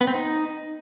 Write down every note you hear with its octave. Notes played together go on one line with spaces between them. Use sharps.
B3
C4
D#4